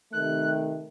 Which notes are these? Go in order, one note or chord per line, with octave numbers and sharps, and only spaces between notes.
C3 D#3 A3 F#6